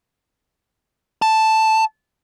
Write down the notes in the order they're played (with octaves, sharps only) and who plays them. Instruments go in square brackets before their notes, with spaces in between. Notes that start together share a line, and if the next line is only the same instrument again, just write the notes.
[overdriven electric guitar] A5